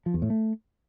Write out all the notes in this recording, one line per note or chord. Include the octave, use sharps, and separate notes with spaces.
F3
E2
A2
A3